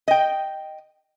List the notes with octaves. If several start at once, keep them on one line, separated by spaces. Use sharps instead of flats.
D#5 G5